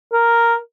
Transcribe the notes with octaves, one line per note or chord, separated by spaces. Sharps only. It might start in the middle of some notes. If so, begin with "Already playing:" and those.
A#4